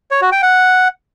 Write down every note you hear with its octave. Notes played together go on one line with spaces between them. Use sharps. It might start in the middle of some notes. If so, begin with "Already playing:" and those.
C#5
F#4
G5
F#5